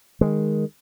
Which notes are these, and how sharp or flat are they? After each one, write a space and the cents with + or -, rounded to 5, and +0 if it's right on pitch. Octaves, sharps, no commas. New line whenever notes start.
D#3 +0 G#3 +0